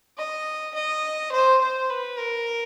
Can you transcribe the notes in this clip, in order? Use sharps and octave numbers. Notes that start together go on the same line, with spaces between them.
D#5
D#5
C5
C5
B4
A#4